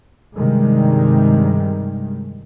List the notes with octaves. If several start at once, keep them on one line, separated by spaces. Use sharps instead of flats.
G2 C3 D#3 G3 G#3